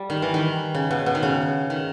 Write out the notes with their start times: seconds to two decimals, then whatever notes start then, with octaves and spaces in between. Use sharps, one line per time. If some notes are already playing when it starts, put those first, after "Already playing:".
Already playing: G3
0.10 D#3
0.22 E3
0.34 D#3
0.74 C#3
0.91 B2
1.06 B2
1.15 D#3
1.23 C#3
1.70 D#3